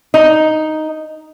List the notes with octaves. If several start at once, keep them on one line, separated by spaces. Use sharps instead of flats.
D#4